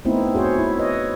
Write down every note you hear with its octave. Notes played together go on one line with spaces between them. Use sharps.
A3 B3 C4 D#4 E4
F#4 G#4 C5 C#5
E4
B4 C#5 D#5